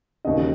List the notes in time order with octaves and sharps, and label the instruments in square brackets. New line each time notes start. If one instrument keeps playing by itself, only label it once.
[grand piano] E1 D#2 C#3 D#5